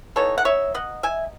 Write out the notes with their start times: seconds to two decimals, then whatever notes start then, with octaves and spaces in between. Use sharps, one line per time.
0.16 E3 B3 D#4 A4 C#5
0.38 F#5
0.45 C#5 E5
0.74 D#5 F#5
1.03 E5 G#5